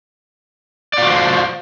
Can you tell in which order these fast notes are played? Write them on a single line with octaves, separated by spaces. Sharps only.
D5 F4 F#4 C5